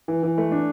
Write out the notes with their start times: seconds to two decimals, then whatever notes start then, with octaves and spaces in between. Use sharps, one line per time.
0.08 E3
0.23 E3
0.38 A3
0.52 D4